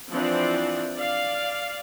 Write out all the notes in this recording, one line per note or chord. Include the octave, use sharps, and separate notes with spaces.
E3 F3 C4 D4 D5
D5 F5